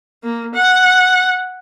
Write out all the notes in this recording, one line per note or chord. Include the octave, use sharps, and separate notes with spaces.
A#3
F#5